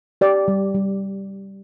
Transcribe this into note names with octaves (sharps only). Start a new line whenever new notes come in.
G4 D5
G3
G3